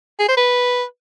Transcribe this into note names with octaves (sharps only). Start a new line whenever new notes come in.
G#4
C5
B4